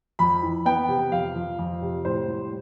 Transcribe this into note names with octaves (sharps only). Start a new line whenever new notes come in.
F2 B5
E3
B3 G5
C3
F2 F5
F3
F2
C3
A2 C5
G3